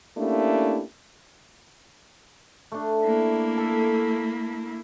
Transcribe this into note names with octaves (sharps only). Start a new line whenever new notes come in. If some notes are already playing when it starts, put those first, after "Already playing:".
A3 A#3 C#4 D4 E4 G4
A3 D4
A#3 E4
A4